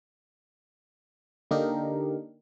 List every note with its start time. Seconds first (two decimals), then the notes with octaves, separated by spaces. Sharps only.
1.51 D3 A#3 D4 D#4 G4 A#4